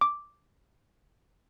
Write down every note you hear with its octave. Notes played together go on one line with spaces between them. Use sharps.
D6